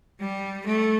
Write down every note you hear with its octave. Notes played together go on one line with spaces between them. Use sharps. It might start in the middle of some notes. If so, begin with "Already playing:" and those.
G3
A3